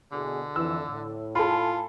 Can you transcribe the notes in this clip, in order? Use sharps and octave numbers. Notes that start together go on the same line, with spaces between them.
E2 B2 D3 G#4
F2 E3 E6
A2
F4 A4 G#5 B5